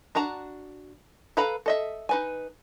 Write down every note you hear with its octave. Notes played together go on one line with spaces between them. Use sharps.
D4 F#4 A5 A#5
A4 B4 F5 A#5 B5
A4 D#5 E5
D#4 B4 G#5